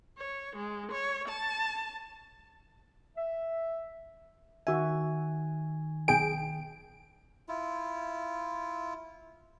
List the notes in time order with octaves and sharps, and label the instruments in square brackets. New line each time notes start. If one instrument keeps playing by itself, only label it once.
[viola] C#5
G#3
C#5
A5
[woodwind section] E5
[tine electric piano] D#3 G#5 [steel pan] F#4 E5
[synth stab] B1 G#4 D7 [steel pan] G5
[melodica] E4 F4